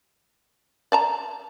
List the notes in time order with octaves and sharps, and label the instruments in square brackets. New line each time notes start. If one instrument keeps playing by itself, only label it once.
[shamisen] D5 A5 A#5